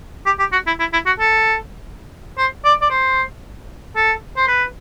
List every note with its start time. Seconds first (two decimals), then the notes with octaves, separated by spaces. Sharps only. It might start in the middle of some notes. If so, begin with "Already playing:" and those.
0.26 G4
0.39 G4
0.52 F#4
0.67 E4
0.79 E4
0.93 E4
1.06 F#4
1.19 A4
2.38 C5
2.64 D5
2.82 D5
2.90 C5
3.96 A4
4.37 C5
4.48 B4